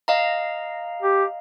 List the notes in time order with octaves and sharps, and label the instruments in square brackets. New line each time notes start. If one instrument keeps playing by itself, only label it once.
[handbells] D#5 F5 A#5
[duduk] G4